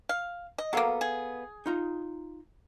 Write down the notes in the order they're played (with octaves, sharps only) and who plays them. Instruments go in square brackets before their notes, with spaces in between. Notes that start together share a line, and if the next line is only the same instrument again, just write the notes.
[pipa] F5
D#5
[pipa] F#3 A#3 [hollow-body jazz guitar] B3 A4 F5
[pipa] G#4
[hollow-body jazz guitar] D#4 F4 A#5